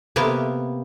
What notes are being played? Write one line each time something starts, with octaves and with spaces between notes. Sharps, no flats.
C3 A#3 B3